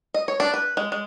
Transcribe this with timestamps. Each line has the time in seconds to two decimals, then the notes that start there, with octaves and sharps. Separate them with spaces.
0.14 D#5
0.28 C#5
0.40 D4
0.54 B4
0.77 G#3
0.92 G#3